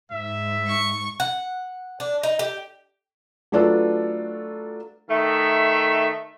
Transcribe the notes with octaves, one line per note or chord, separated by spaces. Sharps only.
G#2 E5
C#6
F#5
D4
D#4
G4
F#3 A3 D4 F4 A4 B4
D#3 A3 E5